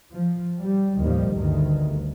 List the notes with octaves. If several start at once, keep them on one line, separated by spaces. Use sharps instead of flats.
F3
G3
D#2 A2 D#3 F3 G3
G1 D2 G2 D#3